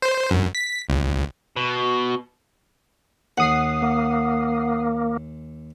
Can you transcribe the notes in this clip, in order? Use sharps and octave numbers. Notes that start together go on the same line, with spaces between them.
C5
F#2
B6
C#2
B2
D#2 F#5 D#6 C7
A#3